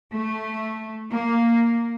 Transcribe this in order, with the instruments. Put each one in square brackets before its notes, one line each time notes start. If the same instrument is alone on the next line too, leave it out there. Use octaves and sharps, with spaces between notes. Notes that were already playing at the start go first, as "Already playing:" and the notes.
[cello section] A3
A#3